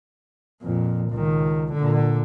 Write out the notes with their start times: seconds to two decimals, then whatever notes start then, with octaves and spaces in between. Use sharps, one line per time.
0.62 F2 A#2
1.11 C#2 D#3
1.73 A#2 D3